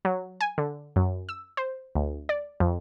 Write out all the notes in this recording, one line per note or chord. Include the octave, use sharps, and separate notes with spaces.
F#3
G#5
D3
F#2
E6
C5
D2
D5
F2